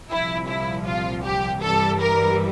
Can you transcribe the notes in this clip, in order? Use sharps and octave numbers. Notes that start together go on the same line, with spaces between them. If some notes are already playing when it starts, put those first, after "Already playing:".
C2 A#2 F3 E4
E4
F4
G4
G2 E3 G3 A4
A#4